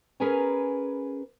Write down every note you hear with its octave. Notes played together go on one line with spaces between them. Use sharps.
C#4 G#4 A#4 B4 G#5 A#5